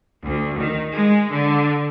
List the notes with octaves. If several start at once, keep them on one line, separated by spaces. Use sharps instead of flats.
D2
D#3
G#3
D3